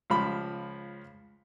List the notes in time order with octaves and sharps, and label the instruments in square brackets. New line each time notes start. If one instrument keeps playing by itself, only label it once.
[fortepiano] C#2 F3 B5